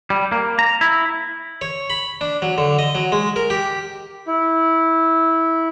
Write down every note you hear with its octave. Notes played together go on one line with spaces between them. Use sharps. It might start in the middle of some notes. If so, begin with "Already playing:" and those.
G3
A#3
A#5
E4
C#5
B5
D4
F#3
D3
D#5
F#3
G#3
A#4
G4
E4